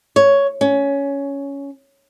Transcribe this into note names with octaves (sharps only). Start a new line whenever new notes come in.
C#5
C#4